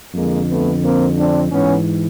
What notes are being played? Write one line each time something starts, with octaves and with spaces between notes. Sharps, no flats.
F2 D3 G#3 A#3
A3 B3
A#3 C4
C4 D4
G#2 E3 B3 C#4